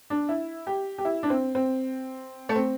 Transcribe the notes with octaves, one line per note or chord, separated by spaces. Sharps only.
D4
E4
G4
G4
E4
D4
C4
C4
A3
C4